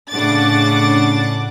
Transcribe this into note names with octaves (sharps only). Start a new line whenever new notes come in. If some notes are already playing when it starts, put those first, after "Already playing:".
A2 C#3 D4 F#5 D6 A6